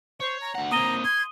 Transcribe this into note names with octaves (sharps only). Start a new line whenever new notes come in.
C5 C#5
A#5
D2 F#5
A#3 C4 A#5 D#6 D#7 G7
C6 G#6